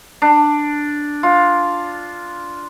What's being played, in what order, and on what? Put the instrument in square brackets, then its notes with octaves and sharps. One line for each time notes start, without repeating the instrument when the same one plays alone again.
[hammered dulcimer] D4
F4